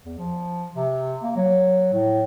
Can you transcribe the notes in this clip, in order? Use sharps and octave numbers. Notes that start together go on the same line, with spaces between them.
E2
F3
C3
A#3
F#3
A2